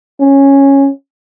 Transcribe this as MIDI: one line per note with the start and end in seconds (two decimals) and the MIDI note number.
0.21 0.89 61